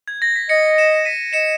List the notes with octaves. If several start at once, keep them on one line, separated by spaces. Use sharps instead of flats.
G#6
A#6
B6
D#5 A#6 C#7
C#7 E7
B6 D#7
D#5 C#7 E7